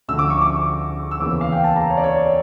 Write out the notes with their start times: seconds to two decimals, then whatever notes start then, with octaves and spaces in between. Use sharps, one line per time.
0.08 D2 D3 F3 E6
0.19 D6
0.30 C#6
0.42 D6
1.11 E6
1.20 E2 C#3 E3 A#3 D6
1.41 F5
1.52 G5
1.64 A5
1.76 A#5
1.90 C#5
1.97 D5
2.04 C#5